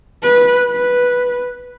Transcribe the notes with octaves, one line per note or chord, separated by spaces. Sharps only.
B4
B4